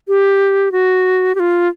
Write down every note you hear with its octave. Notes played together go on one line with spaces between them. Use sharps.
G4
F#4
G4
F4